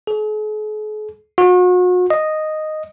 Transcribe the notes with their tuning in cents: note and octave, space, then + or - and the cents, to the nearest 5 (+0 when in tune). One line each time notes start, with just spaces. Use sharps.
G#4 +45
F#4 -40
D#5 -5